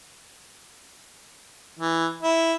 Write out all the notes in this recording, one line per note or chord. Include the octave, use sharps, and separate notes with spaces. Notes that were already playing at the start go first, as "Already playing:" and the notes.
E3
E4